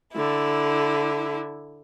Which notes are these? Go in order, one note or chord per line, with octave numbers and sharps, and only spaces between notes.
D3 E4